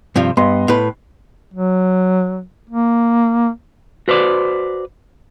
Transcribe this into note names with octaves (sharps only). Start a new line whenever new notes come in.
G2 C3 F3
G2 B3 D#5 C6
A2 B4
F#3
A#3
F#4 B4 C5 D5